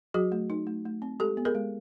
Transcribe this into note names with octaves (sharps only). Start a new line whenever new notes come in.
F#3 F#4 G#4
A3
D#4
A3
A3
C4
G#3 G4 A4
B3
G#4 A#4
G#3